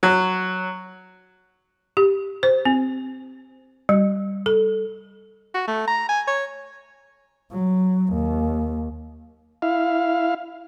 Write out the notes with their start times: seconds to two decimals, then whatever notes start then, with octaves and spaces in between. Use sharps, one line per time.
0.03 F#3
1.97 G4
2.43 C5
2.65 C4
3.89 G3
4.46 A4
5.54 F#4
5.67 A3
5.87 A#5
6.09 G#5
6.27 C#5
7.52 F#3
8.14 D#2
9.62 E4 F5